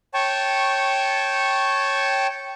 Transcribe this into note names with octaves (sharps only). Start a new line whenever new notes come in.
C#5 G5 A5 C#6